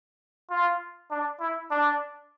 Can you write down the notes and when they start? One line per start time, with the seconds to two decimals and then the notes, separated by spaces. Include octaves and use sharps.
0.50 F4
1.11 D4
1.40 E4
1.71 D4